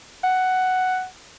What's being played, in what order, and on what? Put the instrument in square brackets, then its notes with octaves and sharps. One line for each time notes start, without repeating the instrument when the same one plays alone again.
[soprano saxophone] F#5